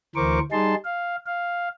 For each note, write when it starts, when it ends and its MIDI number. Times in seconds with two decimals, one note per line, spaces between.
0.16 0.39 38
0.16 0.39 52
0.16 0.39 70
0.16 0.39 72
0.16 0.39 85
0.16 0.39 86
0.52 0.75 55
0.52 0.75 63
0.52 0.75 68
0.52 0.75 81
0.52 0.75 84
0.85 1.16 77
1.26 1.69 77